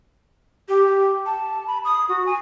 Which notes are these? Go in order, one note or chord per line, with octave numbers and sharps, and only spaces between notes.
G4
A5
B5
D#6
F#4
G#5